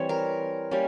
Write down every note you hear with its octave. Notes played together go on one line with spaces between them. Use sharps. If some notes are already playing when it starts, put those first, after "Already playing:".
Already playing: E3 G3 C4 C#5
A#4
G3 A#3 C#4